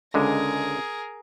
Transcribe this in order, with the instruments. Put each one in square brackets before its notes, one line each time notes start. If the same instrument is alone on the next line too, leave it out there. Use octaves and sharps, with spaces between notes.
[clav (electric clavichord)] C#2 D3 G#3 [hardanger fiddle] G#4 A#4